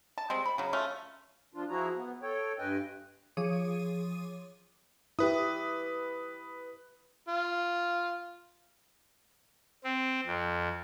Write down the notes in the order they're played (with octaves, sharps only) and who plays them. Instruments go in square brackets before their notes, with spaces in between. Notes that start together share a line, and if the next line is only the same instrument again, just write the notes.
[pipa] A5
G3 G#3 C4
B5
C#3 F#3
A3 C#4 F4 F5
[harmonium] F3 D4 F4
F3 E4 F#4 G#4 A#5
B3
A4 C#5 G5
G2 B4 D#5 G5 G#5
[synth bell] F3 G#4 C#5 D6 D#6 D#7
[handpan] E4 G4 [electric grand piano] B4 D#6
[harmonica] F4
[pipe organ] C4
F2